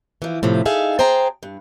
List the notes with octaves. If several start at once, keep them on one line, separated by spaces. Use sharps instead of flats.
E3 F3
A2 C3 F3
D#4 G#4 A4 E5 F5
G#4 C5 G5 A5 A#5
G2